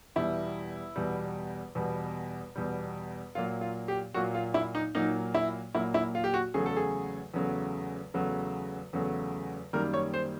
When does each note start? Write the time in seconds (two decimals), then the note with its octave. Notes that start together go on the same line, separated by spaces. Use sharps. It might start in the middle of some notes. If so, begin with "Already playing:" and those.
0.16 E2 B2 G3 E4
0.96 E2 B2 G3
1.75 E2 B2 G3
2.56 E2 B2 G3
3.35 A#2 F#3 A#3 F4
3.61 F4
3.88 G4
4.14 A#2 F#3 A#3 F#4
4.34 F4
4.54 E4
4.75 D#4
4.95 A#2 F#3 A#3 D#4
5.35 E4
5.75 A#2 F#3 A#3 E4
5.94 E4
6.15 F4
6.24 G4
6.34 F#4
6.54 E2 C#3 F#3 A3 G#4
6.66 A4
6.76 G#4
7.34 E2 C#3 F#3 A3
8.14 E2 C#3 F#3 A3
8.93 E2 C#3 F#3 A3
9.73 F#2 D#3 G3 A#3 A#4
9.94 C#5
10.14 C5